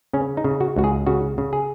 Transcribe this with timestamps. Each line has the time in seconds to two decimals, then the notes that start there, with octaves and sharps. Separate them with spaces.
0.13 C#3 C#4
0.37 D#4
0.44 C#3
0.61 F#4
0.76 C#2 F#4
0.84 G#4
1.06 C#3 F#4
1.38 C#3
1.53 G#4